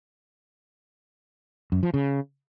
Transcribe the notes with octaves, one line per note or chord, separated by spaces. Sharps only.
F#2
F3
C#3